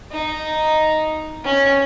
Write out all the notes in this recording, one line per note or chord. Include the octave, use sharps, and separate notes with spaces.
D#4
C#4